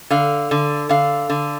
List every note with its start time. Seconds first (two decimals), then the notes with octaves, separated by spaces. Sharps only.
0.10 D3 F5
0.51 D3
0.89 D3 F5
1.30 D3